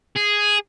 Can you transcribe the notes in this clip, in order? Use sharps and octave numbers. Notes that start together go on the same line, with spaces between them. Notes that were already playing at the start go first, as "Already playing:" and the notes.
G#4